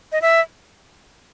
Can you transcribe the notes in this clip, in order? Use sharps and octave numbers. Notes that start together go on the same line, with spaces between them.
D#5
E5